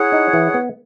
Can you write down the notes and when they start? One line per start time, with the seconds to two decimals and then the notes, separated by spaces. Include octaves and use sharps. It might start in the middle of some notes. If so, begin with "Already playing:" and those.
Already playing: E4 G#4 C#5 F#5
0.12 D#4
0.33 E3
0.54 B3